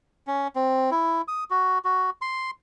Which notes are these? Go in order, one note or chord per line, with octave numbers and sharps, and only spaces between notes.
C#4
C4
E4
D#6
F#4
F#4
C6